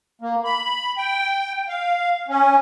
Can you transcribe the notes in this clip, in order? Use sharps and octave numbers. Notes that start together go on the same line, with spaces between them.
A#3
B5
G5
F5
C#4